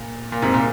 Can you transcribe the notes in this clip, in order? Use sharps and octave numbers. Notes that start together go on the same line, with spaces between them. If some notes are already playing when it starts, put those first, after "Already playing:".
Already playing: A#2
A#2
G#2 C3
A#2